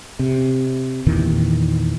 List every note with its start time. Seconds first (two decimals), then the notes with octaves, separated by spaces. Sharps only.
0.19 C3
1.06 E2 A#2 D#3 E3